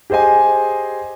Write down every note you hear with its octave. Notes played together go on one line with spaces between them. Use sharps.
G4 G#4 C5 D#5 G#5